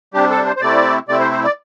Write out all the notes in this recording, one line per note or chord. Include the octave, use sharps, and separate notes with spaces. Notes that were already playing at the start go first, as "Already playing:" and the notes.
C3 G3 D4 G4
A4
C5
C5
C3 A3 C4 E4 D5
C3 A3 C4 E4 D5
C5
C5
D5